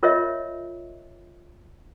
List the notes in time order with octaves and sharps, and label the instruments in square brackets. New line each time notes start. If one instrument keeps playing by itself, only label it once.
[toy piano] F4 A#4 C#5 D#5 E5